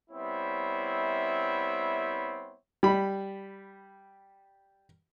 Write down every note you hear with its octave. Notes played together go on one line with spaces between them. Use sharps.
G3 B3 C4 E4 C#5 E5
G3 B5